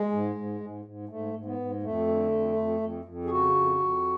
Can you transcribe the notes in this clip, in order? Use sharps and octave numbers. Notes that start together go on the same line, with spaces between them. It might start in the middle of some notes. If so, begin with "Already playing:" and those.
Already playing: G#3
G#2
G#2
G#2
G#2
G#2 A3
G#2
B3
G#2
F2 A3
D3
F2
F2
F2
F2
G#4
C#3 F#4
F2
F2